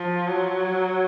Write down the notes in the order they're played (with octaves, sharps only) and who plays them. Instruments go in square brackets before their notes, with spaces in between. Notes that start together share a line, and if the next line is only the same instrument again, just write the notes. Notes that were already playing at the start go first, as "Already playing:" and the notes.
Already playing: [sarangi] F3
F#3